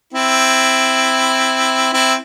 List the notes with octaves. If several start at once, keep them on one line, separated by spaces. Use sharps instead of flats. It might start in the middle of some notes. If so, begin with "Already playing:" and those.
C4 E4
C4 E4